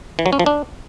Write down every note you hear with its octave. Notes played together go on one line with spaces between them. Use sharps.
E3
F#3
C#4
F3
D4